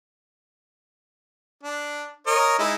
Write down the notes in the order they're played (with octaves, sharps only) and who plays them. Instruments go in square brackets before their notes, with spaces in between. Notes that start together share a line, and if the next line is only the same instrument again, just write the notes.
[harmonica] D4
A#4 C#5 D#5
G#3 D#4 E4